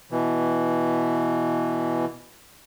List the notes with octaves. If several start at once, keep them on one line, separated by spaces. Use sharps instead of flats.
B2 E3